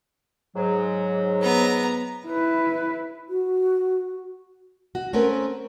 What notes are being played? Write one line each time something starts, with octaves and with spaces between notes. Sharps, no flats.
G#2 F#3
B3 A#5
E4 B4
F#4
F#4
A3 C4 C#4 A#4 B4